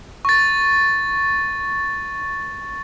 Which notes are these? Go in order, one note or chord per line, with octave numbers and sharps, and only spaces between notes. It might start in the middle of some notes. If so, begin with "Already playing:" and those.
C#6 A6